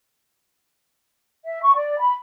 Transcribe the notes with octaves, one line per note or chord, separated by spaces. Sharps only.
E5
C#6
D5
B5